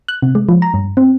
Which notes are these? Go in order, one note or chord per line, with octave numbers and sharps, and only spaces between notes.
F#6
C3
G#3
F3
A#5
G2
C4